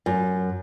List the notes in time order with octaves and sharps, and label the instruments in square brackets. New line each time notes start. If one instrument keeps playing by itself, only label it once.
[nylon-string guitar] F#2